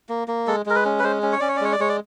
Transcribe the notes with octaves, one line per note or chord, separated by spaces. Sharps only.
A#3
A#3
G#3 A4
G#3 A#4
B4
C#4
B4
G#3 C5
C#4
C#5
C#4 D5
C#5
D5
G#3 C#5
D5
G#3 C#5
D5